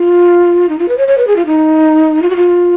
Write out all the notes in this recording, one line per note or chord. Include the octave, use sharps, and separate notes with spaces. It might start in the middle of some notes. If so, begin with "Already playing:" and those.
Already playing: F4
D#4
F4
B4
C#5
C#5
B4
G#4
F4
D#4
F4
F#4
F4